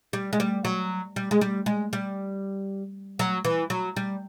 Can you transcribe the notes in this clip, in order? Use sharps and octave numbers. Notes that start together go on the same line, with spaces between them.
G3
G#3
G3
F#3
G3
G#3
G3
G#3
G3
F#3
E3
F#3
G3